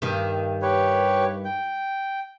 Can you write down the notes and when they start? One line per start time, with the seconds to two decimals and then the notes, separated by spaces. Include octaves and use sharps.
0.02 G2 D#3
0.62 G4 B4 C#5
1.45 G5